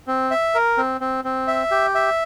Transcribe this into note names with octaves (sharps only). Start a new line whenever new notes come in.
C4
E5
A#4
C4
C4
C4
E5
G4
E5